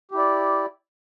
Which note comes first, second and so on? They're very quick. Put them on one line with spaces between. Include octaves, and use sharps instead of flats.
G4 E4 D5